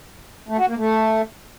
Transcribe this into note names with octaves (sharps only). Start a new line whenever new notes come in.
A3
F#4
A#3
A3